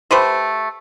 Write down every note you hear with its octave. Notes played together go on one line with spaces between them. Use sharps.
A3 G4 B4 C5